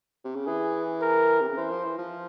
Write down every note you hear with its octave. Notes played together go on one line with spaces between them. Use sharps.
C3
C#3
E3 G#4
A#4
C3
C#3
E3 C5
F3
E3
F3